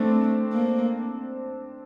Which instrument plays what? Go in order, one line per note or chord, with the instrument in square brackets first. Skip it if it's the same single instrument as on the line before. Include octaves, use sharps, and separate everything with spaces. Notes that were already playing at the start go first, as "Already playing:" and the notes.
Already playing: [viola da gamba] A3 [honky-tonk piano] C4 D4
[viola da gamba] A#3